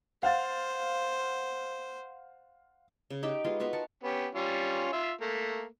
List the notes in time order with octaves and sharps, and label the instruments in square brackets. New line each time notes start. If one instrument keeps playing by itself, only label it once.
[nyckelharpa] C5 [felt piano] F5 F#5 A6
[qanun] C#3
D#4 G4 E5 G5
G#3 B3 F4 G4
B3 F4 F#4 B4
A#4 F#5 A5
[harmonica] B3 C#4 G4
G3 C#4 F4
F4 E5
A3 A#3